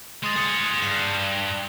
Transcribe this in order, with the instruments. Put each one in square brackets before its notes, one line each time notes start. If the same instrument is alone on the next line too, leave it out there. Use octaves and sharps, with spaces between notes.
[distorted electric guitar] G#3 [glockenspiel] C6 D#6 A6
[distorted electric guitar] G#4 F#5 [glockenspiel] D#6
[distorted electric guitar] G2 [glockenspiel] C7